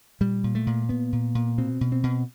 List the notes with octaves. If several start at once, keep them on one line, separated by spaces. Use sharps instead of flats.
A#2 G3
A#2
A3
A#2
A#2 B3
A#2
A#2
B2 C4
B2
C4
B2